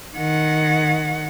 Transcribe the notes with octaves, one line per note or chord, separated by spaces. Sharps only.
D#3 F#5